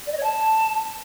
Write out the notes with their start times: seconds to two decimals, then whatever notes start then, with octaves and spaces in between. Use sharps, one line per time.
0.06 D5
0.12 D#5
0.17 C#5
0.23 A5